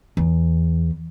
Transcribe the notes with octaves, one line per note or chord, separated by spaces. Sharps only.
E2